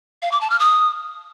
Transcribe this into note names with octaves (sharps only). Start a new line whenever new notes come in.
F5
D6
A5
F6
D#6